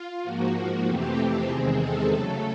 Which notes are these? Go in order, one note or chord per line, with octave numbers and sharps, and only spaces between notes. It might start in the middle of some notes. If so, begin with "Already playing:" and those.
Already playing: F4
G#2 F3 A#3 F#4
F2 C3 E3 A3 C4 G4
E2 C3 D#3 G#3 C4 G#4
A4
C#3 F#3 A3